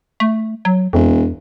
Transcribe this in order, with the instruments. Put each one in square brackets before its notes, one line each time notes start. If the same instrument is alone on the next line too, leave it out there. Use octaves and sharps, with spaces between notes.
[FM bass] A3
F#3
[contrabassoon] E1 [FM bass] F2